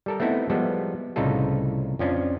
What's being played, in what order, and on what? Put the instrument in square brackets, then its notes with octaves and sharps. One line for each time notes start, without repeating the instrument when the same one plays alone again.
[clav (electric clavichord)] G3 A4 A#4
A3 B3 C4 D#4 E4 A4
F3 G3 G#3 B3 A4
C2 A2 C#3 D#4 F4 A4
F2 F3 C#4 D4